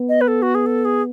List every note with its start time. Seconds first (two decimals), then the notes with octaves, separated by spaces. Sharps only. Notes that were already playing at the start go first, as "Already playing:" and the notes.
Already playing: B3
0.09 D#5
0.21 B4
0.28 A4
0.42 F#4
0.55 G#4
0.66 A4
0.85 G#4